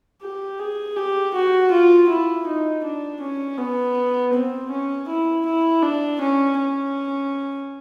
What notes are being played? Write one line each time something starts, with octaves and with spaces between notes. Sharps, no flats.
G4
G#4
G4
F#4
F4
E4
D#4
D4
C#4
B3
C4
C#4
E4
E4
D4
C#4
C#4